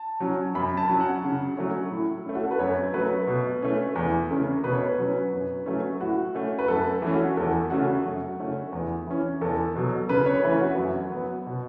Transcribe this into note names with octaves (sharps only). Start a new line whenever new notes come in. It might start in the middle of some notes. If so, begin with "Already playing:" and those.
Already playing: A5
F#3 C#4
F#2 B5
A5
F#3 C#4
F#5
C#3
F#3 A3 C#4
A2
A3 C#4
F#4
A4
B4
F#2 C#5
F#3 A3 C#4 B4
B2
A3 C#4
E2
C#3 A3 C#4
B2 B4
C#5
B4
F#3 C#4
F#2
F#3 A3 C#4
A2 F#4
A3 C#4
B4
F#2 A4
E3 A3 C#4
F#4
E2 A4
C#3 A3 C#4 F#4
F#2
C#3 A3 C#4
E2
E3 C#4
E2 A4
B2 F#3
C#3 B4
C#5
E3 A3 C#4 B4
F#4
F#2
F#3 B3
B2